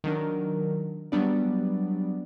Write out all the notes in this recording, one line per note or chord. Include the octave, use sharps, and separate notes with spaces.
D#3 F#3 D4 A#4
F#3 G3 B3 D4 D5